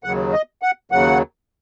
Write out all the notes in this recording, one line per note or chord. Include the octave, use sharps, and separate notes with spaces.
D#2 C#3 F#3 F#5
D#5
F#5
D#2 C#3 F#3 F#5